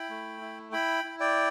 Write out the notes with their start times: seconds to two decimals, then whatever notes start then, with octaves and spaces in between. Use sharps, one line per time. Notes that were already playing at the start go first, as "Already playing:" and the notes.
Already playing: E4 G5 B5
0.09 A3
0.41 E4
0.72 E4 G5 B5
1.04 E4
1.20 D5 G5